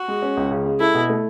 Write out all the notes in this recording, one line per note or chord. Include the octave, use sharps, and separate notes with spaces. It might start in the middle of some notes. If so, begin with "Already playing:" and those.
Already playing: F#4
G#3
C#4
C#2
C#3
G#3
E4 A4
B2
A3